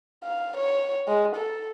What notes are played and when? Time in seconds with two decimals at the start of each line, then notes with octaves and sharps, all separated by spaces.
0.24 F5
0.57 C#5
1.08 G#3
1.36 A4